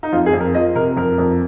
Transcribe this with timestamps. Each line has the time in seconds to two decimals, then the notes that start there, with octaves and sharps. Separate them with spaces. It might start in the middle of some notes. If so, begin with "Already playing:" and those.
0.03 D#4
0.12 F2 F4
0.26 G#4
0.33 F2
0.40 A#4
0.54 F3 D#5
0.75 C3 A#4
0.97 F2 A#4
1.18 F2